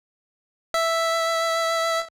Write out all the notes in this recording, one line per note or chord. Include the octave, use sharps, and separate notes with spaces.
E5